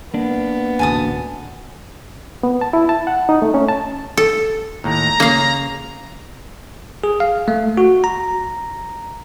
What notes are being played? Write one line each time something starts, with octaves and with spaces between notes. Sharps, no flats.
A#3 B3 D4
E1 A1 D2 G#5 A5 D#6
B3
A5
E4
A5
F#5
D#4
A3
C#4
A5
A4
D#2 A2 A#5
C#3 A#3 F5
G#4
F5
A3
F#4
A#5